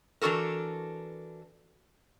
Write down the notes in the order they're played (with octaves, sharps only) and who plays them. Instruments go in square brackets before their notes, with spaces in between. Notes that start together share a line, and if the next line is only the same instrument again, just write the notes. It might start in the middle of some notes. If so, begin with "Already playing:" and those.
[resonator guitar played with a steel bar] E3 D4 F#4 A4 A#4